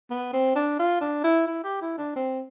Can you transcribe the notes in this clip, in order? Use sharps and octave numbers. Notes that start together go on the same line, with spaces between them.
B3
C4
D4
F4
D4
E4
E4
G4
E4
D4
C4